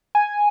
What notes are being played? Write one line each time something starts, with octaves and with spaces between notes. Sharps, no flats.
G#5